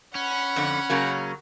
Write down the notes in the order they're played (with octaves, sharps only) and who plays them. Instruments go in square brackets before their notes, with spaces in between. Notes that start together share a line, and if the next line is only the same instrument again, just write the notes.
[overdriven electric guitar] C#4 [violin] F#5 B5
[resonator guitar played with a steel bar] F2 D3
C#3 F#3 A#3